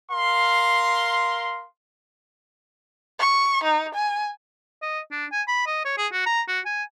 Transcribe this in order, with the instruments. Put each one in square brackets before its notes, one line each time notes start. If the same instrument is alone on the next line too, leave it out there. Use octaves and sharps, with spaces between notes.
[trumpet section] A#4 F5 C6
[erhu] C#6
D#4
G#5
[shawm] D#5
D4
G#5
B5
D#5
C#5
G#4
F#4
A#5
F#4
G#5